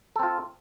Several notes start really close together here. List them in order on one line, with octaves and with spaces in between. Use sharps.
A4 C4 F4